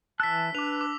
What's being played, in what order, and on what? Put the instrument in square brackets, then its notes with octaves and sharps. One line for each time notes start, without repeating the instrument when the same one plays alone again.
[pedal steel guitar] E3 F#6 [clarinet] A5 [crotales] E6 B6
[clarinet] D4 [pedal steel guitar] B4 [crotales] D6 F7
[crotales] D6